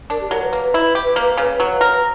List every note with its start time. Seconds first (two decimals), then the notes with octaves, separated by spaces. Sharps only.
0.10 D4 A#4
0.21 G4
0.31 F#3 A#4
0.42 B4
0.53 A#3 B4
0.74 E4
0.95 G4
1.16 A#3
1.37 C#3
1.60 F#3
1.81 A#4